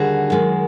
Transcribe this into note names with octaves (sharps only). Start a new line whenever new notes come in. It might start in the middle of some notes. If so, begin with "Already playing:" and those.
Already playing: D#2 D3 G3 F#4 G#4
F#2 D#3 G#3